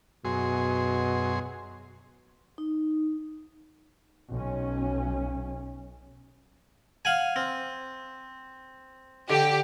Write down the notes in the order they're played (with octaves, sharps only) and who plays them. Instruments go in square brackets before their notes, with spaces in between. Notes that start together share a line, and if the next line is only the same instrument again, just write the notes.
[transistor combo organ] F#2 G#4 C6 [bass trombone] B2
[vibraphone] D#4
[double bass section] B1 C#4
[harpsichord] F5 F#5 G#5
C4
[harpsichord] D3 [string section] G4